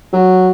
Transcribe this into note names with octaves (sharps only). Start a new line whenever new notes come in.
F#3